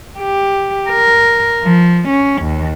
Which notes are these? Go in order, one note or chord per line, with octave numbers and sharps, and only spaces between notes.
G4
A#4
F3
C#4
D#2